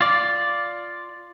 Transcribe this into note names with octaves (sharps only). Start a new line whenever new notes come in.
F4 D5